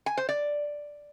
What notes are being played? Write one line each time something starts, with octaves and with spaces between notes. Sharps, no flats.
G#5
C5
D5